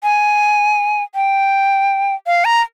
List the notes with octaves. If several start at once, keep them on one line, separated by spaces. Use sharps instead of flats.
G#5
G5
F5
A#5